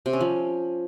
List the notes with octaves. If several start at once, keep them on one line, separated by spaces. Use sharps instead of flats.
C3
C#4
F3